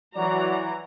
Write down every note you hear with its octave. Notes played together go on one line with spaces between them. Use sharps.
E3 F#3 F#4 D5 A#5